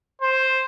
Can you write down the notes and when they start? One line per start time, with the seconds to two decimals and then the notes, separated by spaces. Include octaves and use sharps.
0.22 C5